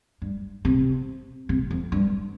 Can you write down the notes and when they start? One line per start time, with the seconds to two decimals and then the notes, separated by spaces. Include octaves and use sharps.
0.22 G2
0.65 C3
1.49 C3
1.71 F2
1.92 G2